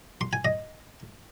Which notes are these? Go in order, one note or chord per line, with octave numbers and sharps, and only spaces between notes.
C6
G#5
D#5